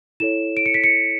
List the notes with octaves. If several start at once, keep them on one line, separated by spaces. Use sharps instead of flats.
E4 A4 C#5 E7
D7
C#7
B6
C#7